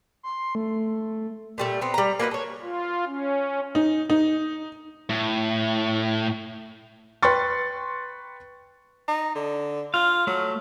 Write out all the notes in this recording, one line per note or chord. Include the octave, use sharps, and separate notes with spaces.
C6
A3
A#2 G3 A3
B3 C4
G3 A#5
A#3 F#4 B4 D#5
A4 C#5
F4
C#4
D#4
D#4
A2
B4 G5 C6 C#6 A6
D#4
D3
F4 F5
F#3 A3